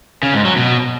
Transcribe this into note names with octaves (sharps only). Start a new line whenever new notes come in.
C#3
G#2
F#3
B2